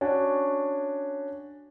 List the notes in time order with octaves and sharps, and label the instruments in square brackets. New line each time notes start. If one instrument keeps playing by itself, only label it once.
[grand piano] C#4 D4 F#4 G#5